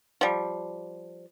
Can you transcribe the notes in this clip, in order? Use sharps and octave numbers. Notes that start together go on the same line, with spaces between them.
F3 G3